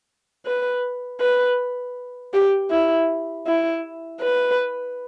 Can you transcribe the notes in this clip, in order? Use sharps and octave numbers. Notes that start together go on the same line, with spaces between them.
B4
B4
G4
E4
E4
B4